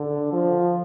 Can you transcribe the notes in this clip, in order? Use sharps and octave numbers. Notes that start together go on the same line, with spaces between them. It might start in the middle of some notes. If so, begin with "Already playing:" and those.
Already playing: D3
F3